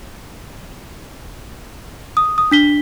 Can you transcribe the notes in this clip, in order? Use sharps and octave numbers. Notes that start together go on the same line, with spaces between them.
D#6
D#6
D4 B6 G7